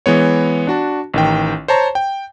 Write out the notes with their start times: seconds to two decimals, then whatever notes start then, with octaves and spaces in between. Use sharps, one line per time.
0.06 E3 G#3 B3 C#5
0.67 D4 F#4 A5
1.14 A1 D#3 G5
1.68 C5 C#5 A5 A#5 C#6
1.95 G5